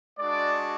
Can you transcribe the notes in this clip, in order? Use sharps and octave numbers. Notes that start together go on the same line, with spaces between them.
G#3 D4 F#4 D5